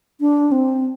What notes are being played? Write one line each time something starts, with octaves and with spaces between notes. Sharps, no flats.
D4
C4